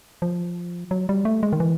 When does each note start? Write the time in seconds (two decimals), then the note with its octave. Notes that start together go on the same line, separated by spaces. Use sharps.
0.22 F3
0.91 F#3
1.09 G3
1.25 A3
1.43 G#3
1.53 D#3
1.60 E3